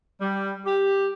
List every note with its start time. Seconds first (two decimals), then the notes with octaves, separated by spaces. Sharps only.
0.20 G3
0.65 G4